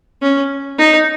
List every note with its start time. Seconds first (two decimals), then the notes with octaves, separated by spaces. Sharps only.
0.22 C#4
0.78 D#4